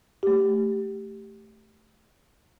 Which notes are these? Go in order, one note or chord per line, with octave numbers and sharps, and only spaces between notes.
A3 G4